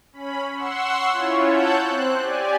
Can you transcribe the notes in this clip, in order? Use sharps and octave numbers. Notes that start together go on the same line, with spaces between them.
C#4 B5
F#5 C6 C#6 E6
C#4 E4 F4 C#5
C#5 F#5 A5 E6 F#6 G6
C4 C5 F#6
G4 D5 G#5